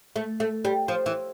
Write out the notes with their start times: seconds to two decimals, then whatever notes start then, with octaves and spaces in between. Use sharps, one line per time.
0.16 A3
0.40 A3
0.65 G3
0.88 F3
1.06 E3